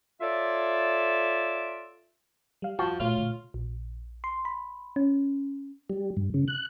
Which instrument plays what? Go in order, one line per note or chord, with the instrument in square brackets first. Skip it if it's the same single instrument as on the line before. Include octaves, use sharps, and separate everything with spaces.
[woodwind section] F4 A4 C#5 D5 E5
[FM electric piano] G3 F5
[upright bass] F2 [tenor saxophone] F3 [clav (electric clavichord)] F#4 [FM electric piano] A5
[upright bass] A#2 [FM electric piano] A3 C#5 F6 [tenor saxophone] F4
[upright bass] A#2 D3
[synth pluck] A#1
C6
B5
C#4
[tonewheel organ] G3
G2
C#3
F#6